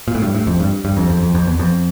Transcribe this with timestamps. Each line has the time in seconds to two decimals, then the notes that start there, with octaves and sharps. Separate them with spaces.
0.08 A#2
0.15 A2
0.22 G2
0.35 A2
0.47 F2
0.60 G2
0.85 G2
0.97 F2
1.10 F2
1.23 F2
1.35 F2
1.47 E2
1.59 F2